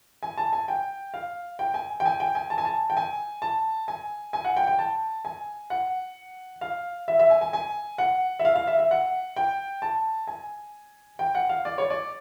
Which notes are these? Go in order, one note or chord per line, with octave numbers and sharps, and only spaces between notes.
G#5
A5
G#5
G5
F5
G5
G#5
G5
G#5
G5
G#5
A5
G#5
A5
G5
G#5
A5
G#5
G#5
F#5
G5
G5
A5
G#5
F#5
F5
E5
E5
G#5
G#5
G#5
F#5
E5
F5
F5
E5
E5
F#5
G5
A5
G#5
G5
F#5
F5
D5
C#5
D5